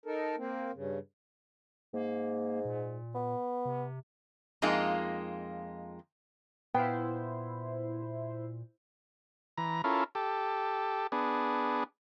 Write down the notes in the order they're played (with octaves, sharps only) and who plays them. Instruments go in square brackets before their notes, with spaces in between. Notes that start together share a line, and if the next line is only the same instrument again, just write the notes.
[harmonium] D#4 A4 A#4
A#3 C4
G2 C#3
[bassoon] G#2 [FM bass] A#3
[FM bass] A#2
[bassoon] B3
[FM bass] C3
[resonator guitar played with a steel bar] F2 G#3 A#3 D#4 F4
[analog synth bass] A#2 [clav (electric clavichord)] B3 F5 [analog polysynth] E4 C5 [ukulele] G5
[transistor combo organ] E3 A#5
C#4 E4 F4 A4 A#4
G4 A4
B3 D4 G#4